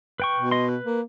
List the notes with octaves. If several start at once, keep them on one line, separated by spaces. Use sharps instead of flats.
B4 G5 C#6
B2
D#5 C6
B4
A#3